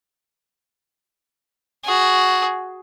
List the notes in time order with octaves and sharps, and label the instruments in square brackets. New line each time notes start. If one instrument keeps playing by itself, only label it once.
[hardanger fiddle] F#4 G#4